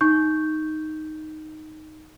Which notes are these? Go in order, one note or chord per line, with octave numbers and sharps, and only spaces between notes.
D#4 C#6 G6